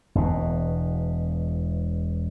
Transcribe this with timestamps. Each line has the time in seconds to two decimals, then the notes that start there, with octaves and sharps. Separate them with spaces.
0.15 E1 B2